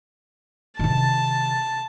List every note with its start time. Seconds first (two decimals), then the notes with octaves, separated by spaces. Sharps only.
0.79 C3 D#3 A5